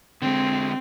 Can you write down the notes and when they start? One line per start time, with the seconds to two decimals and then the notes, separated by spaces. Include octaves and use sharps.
0.22 D3 G#3 C4